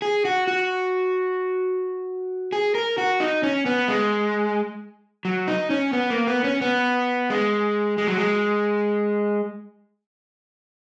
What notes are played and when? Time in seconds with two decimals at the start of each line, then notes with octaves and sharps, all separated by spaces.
0.02 G#4
0.25 F#4
0.47 F#4
2.53 G#4
2.75 A#4
2.98 F#4
3.20 D#4
3.43 C#4
3.66 B3
3.88 G#3
5.25 F#3
5.48 D#4
5.70 C#4
5.93 B3
6.10 A#3
6.27 B3
6.44 C#4
6.61 B3
7.30 G#3
7.98 G#3
8.08 F#3
8.18 G#3